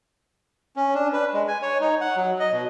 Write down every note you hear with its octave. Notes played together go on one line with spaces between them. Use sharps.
C#4
D4
B4
G#3
G#5
C#5
D#4
F#5
F#3
D#5
B2